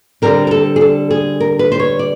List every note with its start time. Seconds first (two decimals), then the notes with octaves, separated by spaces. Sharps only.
0.22 D3 G3 C4 A#4
0.47 A#4
0.51 A4
0.76 G#4
0.81 A4
1.11 G#4
1.40 A#4
1.59 B4
1.72 C5
1.80 C#5
1.99 D5